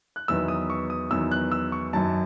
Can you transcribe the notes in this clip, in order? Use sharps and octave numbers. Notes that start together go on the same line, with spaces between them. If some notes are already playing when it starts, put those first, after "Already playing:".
F#6
E2 D#3 F#3 B3 E6
D#6
C#6
D#6
E2 D#3 F#3 B3 E6
F#6
E6
C#6
F#2 D#3 F#3 A5